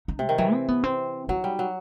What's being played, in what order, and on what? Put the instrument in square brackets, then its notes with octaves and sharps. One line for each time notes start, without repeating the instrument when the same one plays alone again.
[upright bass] D#4
[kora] C3 [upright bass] G3
[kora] D#3
[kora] E3 [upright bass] F#3
[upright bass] C4
B3
C4
[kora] F#3 [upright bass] D#4
[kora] G3
F#3